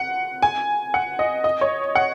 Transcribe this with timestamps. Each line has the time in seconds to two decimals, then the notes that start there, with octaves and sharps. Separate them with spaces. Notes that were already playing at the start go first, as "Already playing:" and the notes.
Already playing: F#5
0.42 G#5
0.94 F#5
1.19 D#5
1.44 D#5
1.61 C#5
1.95 F#5